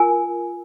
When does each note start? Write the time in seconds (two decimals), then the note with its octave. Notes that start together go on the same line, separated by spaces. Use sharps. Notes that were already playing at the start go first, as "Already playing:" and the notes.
Already playing: F4 A#4 G#5